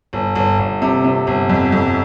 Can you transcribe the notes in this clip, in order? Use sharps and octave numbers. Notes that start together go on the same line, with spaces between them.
G1
G1
G1
C3
C3
G1
F2
F2